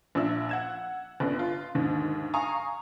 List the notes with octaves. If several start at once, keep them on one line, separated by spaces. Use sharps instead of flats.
A#1 D4 E5 E6
F#5 G#6 E7
G1 B3 D4
F4
D#2 G#2 D3
F5 G#5 A#5 C#6 D#6